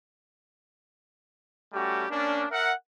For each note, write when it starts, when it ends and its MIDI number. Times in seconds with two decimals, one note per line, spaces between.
1.73 2.04 55
1.73 2.04 57
1.73 2.04 61
1.73 2.04 66
1.73 2.04 67
2.10 2.44 58
2.10 2.44 61
2.10 2.44 62
2.51 2.72 70
2.51 2.72 76
2.51 2.72 78